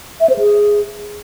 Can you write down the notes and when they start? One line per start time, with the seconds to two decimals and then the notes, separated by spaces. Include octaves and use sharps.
0.21 E5
0.30 C5
0.39 G#4